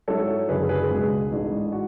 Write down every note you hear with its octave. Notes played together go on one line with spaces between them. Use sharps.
G#2 F#3 C#4 E4 A4 C#5
F#1 F#2 D3 G#4 B4
G#4 B4
C#2 B2 G#3 D4 G#4
A1 G#2 G#3 D4
F#4